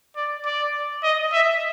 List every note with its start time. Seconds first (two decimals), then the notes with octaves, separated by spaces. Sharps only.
0.16 D5
0.46 D5
1.03 D#5
1.32 E5